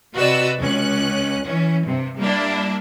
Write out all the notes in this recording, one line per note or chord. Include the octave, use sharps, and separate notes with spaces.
C3 F#4 B4 D5 D#5 E6
C#2 C#4 F#6
E3 C#4
G2 C3
G3 A#3 D4 E4